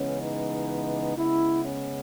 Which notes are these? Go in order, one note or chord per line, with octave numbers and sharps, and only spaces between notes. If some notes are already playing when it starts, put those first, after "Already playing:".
Already playing: C#3 E3 G#3 B3 C#4
D#4
C#3 G#3 B3 E4
C#4